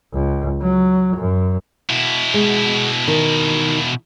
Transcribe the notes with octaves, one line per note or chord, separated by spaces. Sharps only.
C#2
F#3
F#2
B2 E4
G#3
D#3